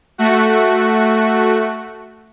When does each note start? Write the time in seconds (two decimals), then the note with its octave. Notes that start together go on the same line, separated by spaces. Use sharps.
0.18 A3 F#4